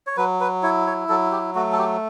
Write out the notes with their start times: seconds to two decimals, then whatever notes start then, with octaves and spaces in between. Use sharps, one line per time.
0.07 C#5
0.17 F#3 B4
0.40 B4
0.63 E4 C#5
0.87 C#5
1.09 F#3 A4
1.32 G4
1.55 A3 F#4
1.72 A4
1.78 G4